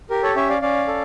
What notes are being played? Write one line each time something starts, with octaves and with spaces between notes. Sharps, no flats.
G4 A#4
A4 C#5
C#4 C#5 E5
D5 F5
C#4 D5 F5
A4